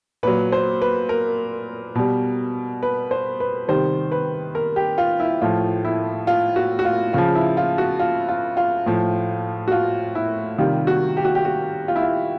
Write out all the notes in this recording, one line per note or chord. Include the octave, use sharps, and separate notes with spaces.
A#2 F#3 B4
C5
B4
A#4
B2 G3
B4
C5
B4
C3 D#3 G3 C5
B4
A#4
G4
F4
E4
A2 F3 F4
E4
F4
F#4
F#4
F4
C#3 F3 F4
E4
F4
F#4
F4
F4
F4
A2 F3
F#4
F4
E4
C3 D#3 G3 F4
F#4
G4
F#4
G4
F#4
F4
E4
F4